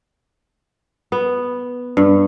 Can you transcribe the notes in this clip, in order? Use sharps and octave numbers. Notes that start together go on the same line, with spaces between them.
B3
G2